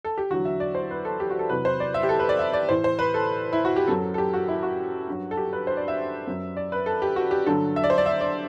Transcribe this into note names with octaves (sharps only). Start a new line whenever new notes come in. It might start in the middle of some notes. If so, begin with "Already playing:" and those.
A4
G4
E2 D3 F#3 F#4
E5
D5
C5
B4
A4
G4
F#4
A4
E2 C3 F#3 B4
C5
D5
E5
G4
A4
B4
D5
E5
D5
A2 E3 C5
C5
B4
A4
E4
F#4
G4
F#2 F#3 A4
A4
G4
F#4
E4
F#4
G2 F#3
A4
G4
B4
C5
D5
E5
F#2 F#3
D5
B4
A4
G4
F#4
G4
G2 D3 F#3 A4
E5
D5
C5
D5
E5
D5